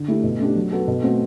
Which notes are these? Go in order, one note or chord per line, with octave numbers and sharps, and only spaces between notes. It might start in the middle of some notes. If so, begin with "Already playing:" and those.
Already playing: D3
A3 E4 G4
B2
A3 D4 G4
F#3
B3 F#4 A4
B2
A3 C4 F#4